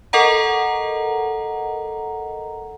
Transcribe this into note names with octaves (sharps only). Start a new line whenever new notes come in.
A4 A#4 D#5 F#5 A#5